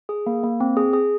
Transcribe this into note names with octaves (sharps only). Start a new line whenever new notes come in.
G#4
A#3
A#3
C4
G#4
G#4